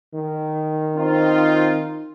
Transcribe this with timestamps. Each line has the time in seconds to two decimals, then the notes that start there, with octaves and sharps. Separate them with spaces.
0.14 D#3
0.97 C4 D#4 F4